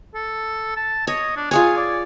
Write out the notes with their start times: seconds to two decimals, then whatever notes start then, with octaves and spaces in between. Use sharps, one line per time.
0.15 A4
0.77 A5
1.07 C#5 D#5
1.37 D4
1.51 F4 G#4 C#5 G#5
1.77 D5